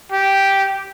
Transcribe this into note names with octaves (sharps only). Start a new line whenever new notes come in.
G4